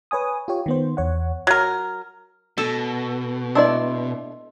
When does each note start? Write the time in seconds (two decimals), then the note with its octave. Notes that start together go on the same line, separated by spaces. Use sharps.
0.11 B4 C#5 G#5 D#6
0.48 F4 G4 C#5
0.66 D#3 B3 C5
0.97 E2 C#5 F#5
1.47 F#3 A#4
2.58 B2 A4
3.55 D4 E4 D5 D#5 C6 E6